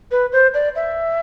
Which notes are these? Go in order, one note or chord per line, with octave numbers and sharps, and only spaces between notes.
B4
C5
D5
E5